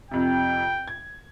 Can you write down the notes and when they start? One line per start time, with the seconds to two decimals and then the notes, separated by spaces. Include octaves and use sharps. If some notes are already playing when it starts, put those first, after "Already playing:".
0.11 F2 C3 G5
0.88 G#6